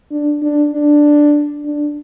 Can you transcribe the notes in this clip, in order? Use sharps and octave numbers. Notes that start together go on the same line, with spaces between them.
D4
D4
D4
D4